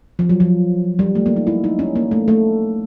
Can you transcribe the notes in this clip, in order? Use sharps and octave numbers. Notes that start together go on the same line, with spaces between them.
F3
F#3
F3
G3
A3
A#3
D#4
E4
D#4
C#4
A#3
A3
A3